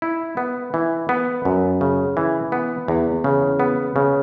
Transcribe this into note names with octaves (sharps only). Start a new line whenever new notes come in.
E4
B3
E3
B3
F#2
C#3
E3
B3
E2
C#3
B3
C#3